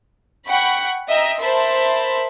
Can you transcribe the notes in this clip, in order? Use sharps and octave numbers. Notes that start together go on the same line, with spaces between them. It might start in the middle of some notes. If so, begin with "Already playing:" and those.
F#5 G5 B5 C#6
D#5 E5 G5 A#5 E6
A#4 C5 E5 A5 B5 C6